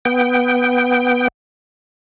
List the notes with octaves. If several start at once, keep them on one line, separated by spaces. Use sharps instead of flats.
B3 G5